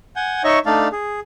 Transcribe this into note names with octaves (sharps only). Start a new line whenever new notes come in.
F#5 G#5 G6
D#4 C#5 D#5 E5 C#6
A3 D4 D#4 D5 F5
G#4